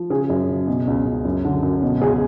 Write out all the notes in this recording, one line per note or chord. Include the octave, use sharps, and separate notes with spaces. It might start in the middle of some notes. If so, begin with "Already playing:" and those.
Already playing: F3
C#3 G#4
F#2
C#3
B2
C#2
C#2
F#2
D3
F#2
B2
C#2 G#4